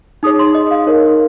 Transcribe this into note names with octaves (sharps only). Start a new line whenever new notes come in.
D#4 G#4 C#5 D#6
C6
D#5
F5
D#4 A#4 C#5